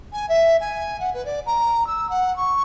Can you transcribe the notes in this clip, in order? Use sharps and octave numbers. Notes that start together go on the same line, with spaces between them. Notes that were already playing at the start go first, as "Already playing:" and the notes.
G#5
E5
G#5
F#5
B4
D5
A#5
E6
F#5
C#6